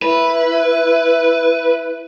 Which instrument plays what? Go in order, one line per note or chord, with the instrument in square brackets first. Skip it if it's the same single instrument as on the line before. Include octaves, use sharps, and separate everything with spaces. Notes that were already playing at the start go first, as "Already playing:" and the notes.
[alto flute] E4 [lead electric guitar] B4